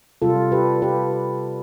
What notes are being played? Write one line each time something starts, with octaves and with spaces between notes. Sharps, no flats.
C3 G3 F4 A4
G4 B4
G4 B4